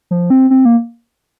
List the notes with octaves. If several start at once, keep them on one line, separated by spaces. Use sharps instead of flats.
F3
C4
C4
A#3